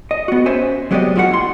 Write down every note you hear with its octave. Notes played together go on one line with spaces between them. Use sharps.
D#5
B3 F#4
C#4 C5 E5 G#5
F#3 G#3 B3 G4 D5 D#5
G2 F4 F#4 A4 F#5
E4 C6